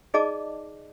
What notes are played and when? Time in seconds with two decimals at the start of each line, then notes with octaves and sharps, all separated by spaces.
0.14 D#4 G#4 D5 D#5 A5 D6